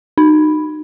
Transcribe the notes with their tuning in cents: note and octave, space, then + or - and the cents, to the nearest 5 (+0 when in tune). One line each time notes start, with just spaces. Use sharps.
D#4 -25